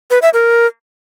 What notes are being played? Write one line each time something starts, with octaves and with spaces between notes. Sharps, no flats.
B4
E5
A#4